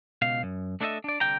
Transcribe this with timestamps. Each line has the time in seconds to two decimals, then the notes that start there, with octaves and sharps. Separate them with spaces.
0.22 C#2 B2 F5
0.43 F#2
0.81 A3 D4 E4 A4 D#5 E5
1.04 D4 D5
1.20 C2 G2 D3 G5 A#5